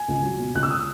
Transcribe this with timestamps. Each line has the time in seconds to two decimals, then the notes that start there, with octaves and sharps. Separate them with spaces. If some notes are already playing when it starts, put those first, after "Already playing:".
Already playing: G#5
0.08 C#2
0.23 F#3
0.39 B2
0.55 C#2 F#6
0.63 E6
0.70 D#6